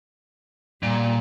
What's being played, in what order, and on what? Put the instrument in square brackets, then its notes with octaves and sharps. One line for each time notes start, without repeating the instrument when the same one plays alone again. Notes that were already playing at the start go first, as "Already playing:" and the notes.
[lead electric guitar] A#2 [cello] G3